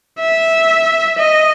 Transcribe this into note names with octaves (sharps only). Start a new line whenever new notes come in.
E5
D#5